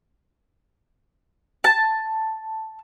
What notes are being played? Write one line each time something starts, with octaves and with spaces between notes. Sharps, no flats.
A5